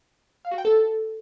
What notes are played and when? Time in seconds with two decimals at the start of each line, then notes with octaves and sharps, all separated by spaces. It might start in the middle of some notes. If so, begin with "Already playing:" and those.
0.45 F5
0.51 F#4
0.58 G5
0.65 A4